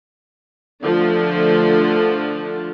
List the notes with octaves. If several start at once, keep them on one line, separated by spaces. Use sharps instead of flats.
D3 F3 A3